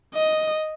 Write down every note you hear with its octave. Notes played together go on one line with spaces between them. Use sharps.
D#5